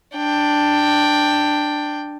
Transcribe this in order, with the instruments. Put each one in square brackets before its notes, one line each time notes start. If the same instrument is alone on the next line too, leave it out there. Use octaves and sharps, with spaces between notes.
[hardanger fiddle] D4 G5